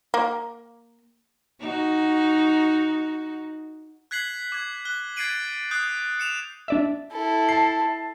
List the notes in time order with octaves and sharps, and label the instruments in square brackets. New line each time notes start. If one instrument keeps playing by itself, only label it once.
[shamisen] A#3
[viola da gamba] D#4 F#4
[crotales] F#6 G#6 B6 C7 F#7
D6 G#6
F#6 G7
G#6 A6 C7 D7 D#7 F#7
D#6 F#6 G6 C7
C#7 E7 F7
[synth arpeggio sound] D4 D5 E5
[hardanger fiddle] E4 A4
[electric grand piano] A5 C7